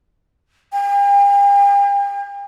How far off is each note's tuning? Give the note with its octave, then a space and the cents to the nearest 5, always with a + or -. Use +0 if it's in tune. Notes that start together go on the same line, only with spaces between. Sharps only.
G5 +45